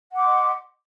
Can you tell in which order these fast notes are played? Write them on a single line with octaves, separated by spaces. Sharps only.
F#5 D6 C6 D#5